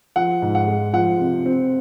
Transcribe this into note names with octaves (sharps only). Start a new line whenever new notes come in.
F3 F#5
G#2
F#5
G#3
F3 F#5
C3
C4